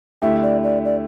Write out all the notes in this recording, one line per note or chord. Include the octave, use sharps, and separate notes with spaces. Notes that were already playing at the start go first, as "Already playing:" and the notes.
D2 D3 A3 E4 G4 E5
D5
D5
D5